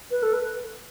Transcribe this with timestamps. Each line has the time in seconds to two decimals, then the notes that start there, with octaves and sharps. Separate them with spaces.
0.11 B4
0.23 A4
0.34 B4